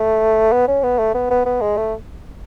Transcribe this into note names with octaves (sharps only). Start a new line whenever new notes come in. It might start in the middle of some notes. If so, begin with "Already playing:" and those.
Already playing: A3
B3
C#4
B3
A3
B3
B3
B3
G#3
A3